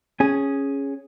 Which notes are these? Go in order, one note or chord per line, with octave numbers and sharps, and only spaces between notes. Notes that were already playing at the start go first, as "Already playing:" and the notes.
C#4 G#4